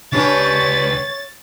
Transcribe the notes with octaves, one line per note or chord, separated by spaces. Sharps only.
C#2 C#4 D4 G4 B4 C#5 A6